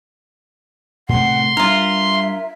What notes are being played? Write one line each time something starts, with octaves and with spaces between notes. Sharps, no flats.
A2 C3 A3 F#5 C6
G3 A#3 D4 F4 A#4 E5